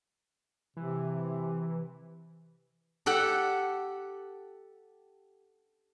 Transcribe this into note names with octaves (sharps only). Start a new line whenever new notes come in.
C3 E3
G4 A4 F#5 G5